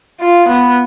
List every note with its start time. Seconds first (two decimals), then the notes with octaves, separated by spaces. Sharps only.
0.21 F4
0.48 B3